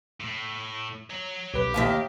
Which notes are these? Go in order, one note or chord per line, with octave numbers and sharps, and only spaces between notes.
A2
C#5 A#5
B1 G4 B4
D#2 D#3 E5 F5